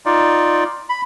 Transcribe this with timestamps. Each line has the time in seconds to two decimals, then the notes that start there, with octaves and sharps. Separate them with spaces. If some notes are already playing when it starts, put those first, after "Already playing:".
0.06 D#4 F4 D5
0.89 B5